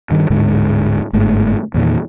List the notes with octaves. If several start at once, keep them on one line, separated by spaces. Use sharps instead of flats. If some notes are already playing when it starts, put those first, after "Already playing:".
G2 D#3
D1 G#2 D3 G#3
G1 G#2 A3
E2 A#2 D#3